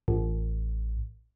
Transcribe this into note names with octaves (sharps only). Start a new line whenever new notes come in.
A1